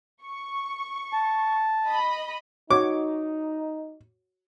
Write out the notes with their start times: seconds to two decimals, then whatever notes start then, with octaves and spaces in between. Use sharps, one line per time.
0.23 C#6
1.13 A5
1.87 D#5 B5
2.71 D#4 F#4 C#5 D6